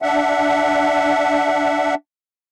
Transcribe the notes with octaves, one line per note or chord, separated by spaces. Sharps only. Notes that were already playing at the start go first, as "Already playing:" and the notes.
D4 E5 F#5